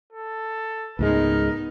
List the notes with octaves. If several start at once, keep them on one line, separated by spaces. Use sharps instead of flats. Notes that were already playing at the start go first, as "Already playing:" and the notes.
A4
C#2 G#2 G#3 A3 B3 D#4 A#4